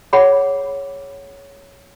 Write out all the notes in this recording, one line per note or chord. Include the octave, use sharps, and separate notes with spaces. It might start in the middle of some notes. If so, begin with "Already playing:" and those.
G#4 C#5 F#5 B5